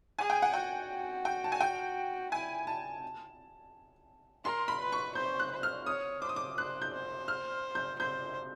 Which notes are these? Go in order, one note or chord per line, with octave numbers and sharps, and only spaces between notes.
G#4 G#5
G5
F#5
F#4 G5
G5
A5
G#5
G5
E4 G#5
A5
A#4 C6
B5
B4
C#6
C5 G6
F#6
C5
F6
C#5 D#6
C5 D6
D#6
D6
C5 F#6
G6
C5
F6
G6
C5 G6